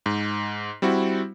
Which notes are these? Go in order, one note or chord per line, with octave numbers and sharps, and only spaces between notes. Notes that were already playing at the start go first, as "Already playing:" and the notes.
G#2
G3 C4 E4 F#4